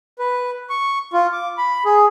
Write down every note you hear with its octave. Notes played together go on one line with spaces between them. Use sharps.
B4
C#6
F4
D6
B5
G#4